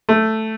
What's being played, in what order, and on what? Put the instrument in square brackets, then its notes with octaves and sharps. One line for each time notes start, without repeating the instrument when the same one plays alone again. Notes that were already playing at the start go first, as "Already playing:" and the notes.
[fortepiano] A3